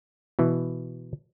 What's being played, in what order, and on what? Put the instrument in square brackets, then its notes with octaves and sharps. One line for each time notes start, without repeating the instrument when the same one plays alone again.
[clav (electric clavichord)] B2 E3